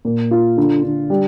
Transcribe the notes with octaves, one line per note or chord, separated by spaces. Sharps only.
A#2
F4
D3
D3
G3